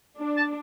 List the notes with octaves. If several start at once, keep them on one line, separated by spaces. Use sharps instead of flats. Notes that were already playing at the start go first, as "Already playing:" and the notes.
D4
A5